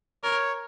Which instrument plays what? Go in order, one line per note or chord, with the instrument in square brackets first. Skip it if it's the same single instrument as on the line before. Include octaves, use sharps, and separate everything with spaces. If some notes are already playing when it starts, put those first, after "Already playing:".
[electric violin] A#4 [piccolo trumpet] C#5